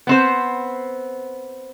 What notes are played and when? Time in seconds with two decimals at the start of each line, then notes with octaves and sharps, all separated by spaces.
0.07 B3 C4 C5